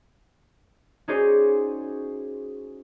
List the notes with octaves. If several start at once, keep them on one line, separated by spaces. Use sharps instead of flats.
C#4 D#4 F#4 G#4 C5 D5